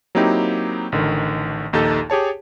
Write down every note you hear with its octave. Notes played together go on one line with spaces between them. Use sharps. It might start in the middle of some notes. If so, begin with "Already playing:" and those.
F#3 A#3 C4 D#4 E4 G4
A1 D3 D#3
A#1 D#2 D#4 G4 A4
G4 G#4 C#5 A5